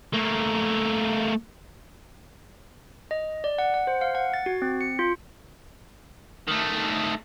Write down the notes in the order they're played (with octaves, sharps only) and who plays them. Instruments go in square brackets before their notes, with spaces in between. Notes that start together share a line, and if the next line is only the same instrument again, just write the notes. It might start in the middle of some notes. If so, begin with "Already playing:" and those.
[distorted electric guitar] A3 A#3
[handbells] D#5
D5
F#5
F#5
C5
F5
F#5
A6
F#4
C4
C#7
F4
[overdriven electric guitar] D#3 A3